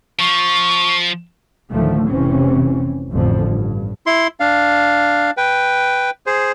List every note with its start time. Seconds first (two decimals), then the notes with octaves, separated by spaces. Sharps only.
0.20 F3 C#6
1.70 D2 A2 D3 D#3 F3 A3
2.07 F1 C3 E3 C4 C#4
3.12 A1 F2 B2 D3 F3
3.49 G2
4.06 E4 C6
4.40 D4 F5
5.37 B4 G5
6.26 G#4 C5